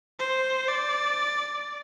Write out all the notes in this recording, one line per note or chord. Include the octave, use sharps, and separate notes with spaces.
C5
D5